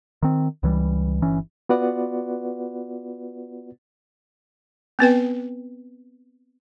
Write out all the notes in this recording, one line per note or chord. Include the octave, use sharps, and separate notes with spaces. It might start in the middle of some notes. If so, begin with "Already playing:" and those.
D#3 C4
C#2 E3 G3
G1 E3 C#4
B3 F4 F#4 B4 D5 F#5
B3 C4 B4 G5